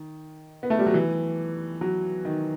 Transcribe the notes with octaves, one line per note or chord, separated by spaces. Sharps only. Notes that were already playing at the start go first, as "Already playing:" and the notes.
Already playing: D#3
B3
A3
G3
F#3
E3
F#3
D#3